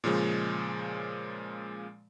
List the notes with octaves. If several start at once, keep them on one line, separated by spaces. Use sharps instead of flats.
A#2 C#3 F3 G#3